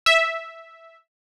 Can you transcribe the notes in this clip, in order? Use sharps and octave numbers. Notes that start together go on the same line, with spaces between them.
E5